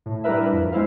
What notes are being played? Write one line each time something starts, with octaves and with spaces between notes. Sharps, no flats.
A2
G3 D4 E4 A#4 B4 E5
F2
G#3 B3 E4 C5 F5